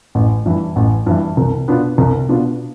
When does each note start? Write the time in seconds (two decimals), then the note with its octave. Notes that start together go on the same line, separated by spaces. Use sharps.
0.15 A1
0.46 G2 E3
0.76 A1
1.06 G2 E3
1.37 C2
1.67 B2 B3 D4 F4
1.98 C2
2.28 B2 B3 D4 F4